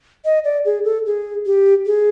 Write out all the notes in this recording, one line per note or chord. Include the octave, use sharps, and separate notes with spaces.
D#5
D5
G#4
A4
G#4
G4
G#4